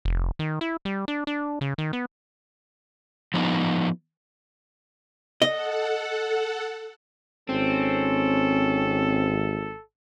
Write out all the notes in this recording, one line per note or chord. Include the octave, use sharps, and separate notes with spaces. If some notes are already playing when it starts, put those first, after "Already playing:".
F1
D#3
E4
G3
D4
D4
C#3
D#3
B3
F3 B3 D#4
A4 D#5 F#5
G#1 C4 C#4 A4